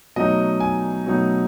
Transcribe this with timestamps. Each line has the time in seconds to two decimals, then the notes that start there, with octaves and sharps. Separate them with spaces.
0.16 B2 F#3 A3 D#4 D#5
0.60 G#5
1.06 B2 F#3 A3 D#4